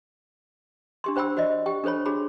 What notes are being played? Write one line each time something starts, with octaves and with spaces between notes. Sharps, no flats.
D4 G4 C6
D4 C5 G5 B5 E6
F#4 C5 D5 D#5
G4 G5
D4 A4 C5 C#5 B5
D4 F#4 G#4 B5